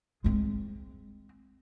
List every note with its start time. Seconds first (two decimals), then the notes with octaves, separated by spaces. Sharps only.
0.24 G#3 C4